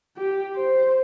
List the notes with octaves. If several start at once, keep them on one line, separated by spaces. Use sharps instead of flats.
G4
C5